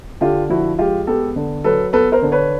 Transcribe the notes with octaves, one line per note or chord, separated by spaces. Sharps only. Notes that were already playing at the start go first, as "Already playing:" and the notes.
D3 F4 G4
F3 E4 F#4
G#3 F4 G4
B3 G4 A4
D3
F#3 A4 B4
B3 A4 B4
A#4 C5
D3
B4 C#5